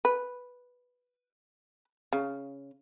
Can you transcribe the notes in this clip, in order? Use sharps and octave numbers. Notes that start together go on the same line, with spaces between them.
B4
C#3